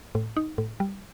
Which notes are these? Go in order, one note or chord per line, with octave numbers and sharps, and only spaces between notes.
A2
D#4
A2
G3